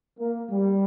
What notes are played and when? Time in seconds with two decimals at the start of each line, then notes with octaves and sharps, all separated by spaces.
0.20 A#3
0.50 G3